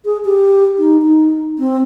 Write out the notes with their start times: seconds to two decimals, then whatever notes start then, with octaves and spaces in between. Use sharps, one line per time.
0.05 G#4
0.25 G4
0.78 D#4
1.02 D#4
1.59 C4